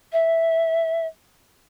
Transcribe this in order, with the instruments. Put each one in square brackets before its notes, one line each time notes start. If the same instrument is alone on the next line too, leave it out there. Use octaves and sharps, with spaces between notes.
[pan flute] E5